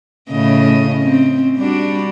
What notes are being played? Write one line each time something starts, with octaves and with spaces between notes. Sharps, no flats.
A2 C#3 D#5
C4 C#4
G3 D4 F#4